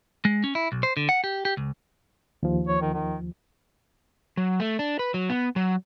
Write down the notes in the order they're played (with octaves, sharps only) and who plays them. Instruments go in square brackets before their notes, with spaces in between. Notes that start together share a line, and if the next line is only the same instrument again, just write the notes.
[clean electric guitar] G#3
C#4
E4
B1
C5
D3
F#5
G4
G4
C#2
[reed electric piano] D#2 F3
[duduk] C#5
D#3
D#3
[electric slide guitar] F#3
A3
D4
B4
F#3
B3
F#3